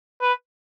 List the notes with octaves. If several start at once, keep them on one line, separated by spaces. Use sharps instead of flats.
B4